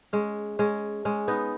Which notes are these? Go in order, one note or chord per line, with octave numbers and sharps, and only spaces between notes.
G#3 C#4
G#3 C#4
G#3 C#4
B3 D#4